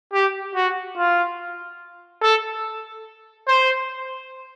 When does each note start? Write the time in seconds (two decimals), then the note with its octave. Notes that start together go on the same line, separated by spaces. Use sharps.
0.13 G4
0.55 F#4
0.97 F4
2.22 A4
3.48 C5